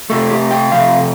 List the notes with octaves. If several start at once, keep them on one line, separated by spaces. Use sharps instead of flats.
C3 A3 A4
G4
G5
C3 F3 A3 F5